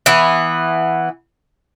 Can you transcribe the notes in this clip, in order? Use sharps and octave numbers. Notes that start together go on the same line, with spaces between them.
E3 B3